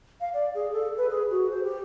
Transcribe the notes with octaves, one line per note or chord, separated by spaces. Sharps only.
F5
D5
G#4
A4
B4
G#4
F#4
C5
G4